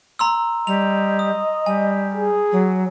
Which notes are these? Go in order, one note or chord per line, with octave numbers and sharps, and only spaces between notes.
A#5 C6 E6
G3 D#5 F7
D#6
G3 G#5
G#4
F#3